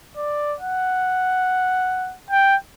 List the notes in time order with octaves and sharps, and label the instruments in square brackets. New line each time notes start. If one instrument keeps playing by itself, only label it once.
[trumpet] D5
F#5
G5